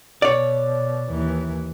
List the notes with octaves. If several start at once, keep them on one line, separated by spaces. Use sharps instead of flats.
B2 C#5 D5
D#2 E3